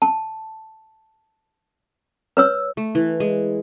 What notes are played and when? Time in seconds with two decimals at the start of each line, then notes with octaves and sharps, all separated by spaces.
0.02 A5
2.37 B4 C#5 E6
2.77 A3
2.95 E3
3.20 G#3